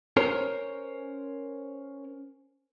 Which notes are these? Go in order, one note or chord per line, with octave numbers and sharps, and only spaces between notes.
C#4 A#4 C5 C#5